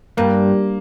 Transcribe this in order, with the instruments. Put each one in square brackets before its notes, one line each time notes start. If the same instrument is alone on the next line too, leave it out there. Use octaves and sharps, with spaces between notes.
[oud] G2 [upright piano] A#3